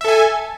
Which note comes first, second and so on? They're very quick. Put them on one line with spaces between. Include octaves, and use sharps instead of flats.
E5 A4 G#5